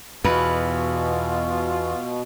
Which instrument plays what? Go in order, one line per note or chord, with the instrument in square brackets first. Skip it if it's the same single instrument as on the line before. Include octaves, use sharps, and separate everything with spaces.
[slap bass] E2 [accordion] B2 [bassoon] F4 [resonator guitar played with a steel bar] B4